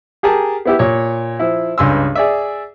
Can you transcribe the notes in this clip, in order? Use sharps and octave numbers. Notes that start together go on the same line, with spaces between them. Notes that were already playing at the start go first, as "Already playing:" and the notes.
G4 G#4 A#4 A5
B3 E4 G4
A#2 C#5
F3 E4
C#2 G2 G#5 C6 E6
G#4 D5 E5